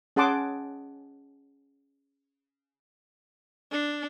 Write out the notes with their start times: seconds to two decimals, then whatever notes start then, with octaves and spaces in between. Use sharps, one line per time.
0.16 C#4 G#4 F#5 A5 C6 D6
3.72 D4